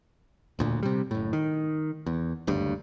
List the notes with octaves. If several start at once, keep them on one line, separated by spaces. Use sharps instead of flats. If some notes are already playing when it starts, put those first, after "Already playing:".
E1 D2 A#2
C3 G3
F#1 A2
D#3
E2
F#1 D2 G2